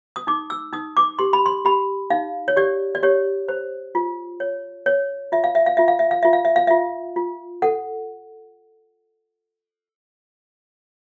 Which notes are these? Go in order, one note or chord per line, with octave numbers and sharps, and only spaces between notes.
D#6
D#4 D6
E6
D#4 D#6
D6
G4 C6
B5
C6
G4 B5
D#4 F5
C#5
G4 D5
D5
G4 C#5
C5
F4
C#5
C#5
F4 E5
F5
E5
F5
F4 E5
F5
E5
F5
F4 E5
F5
E5
F5
F4 E5
F4
A4 F#5